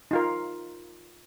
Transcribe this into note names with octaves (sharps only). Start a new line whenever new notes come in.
D#4 F4 A#4